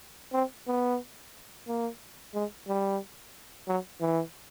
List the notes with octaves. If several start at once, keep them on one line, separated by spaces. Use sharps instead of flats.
C4
B3
A#3
G#3
G3
F#3
E3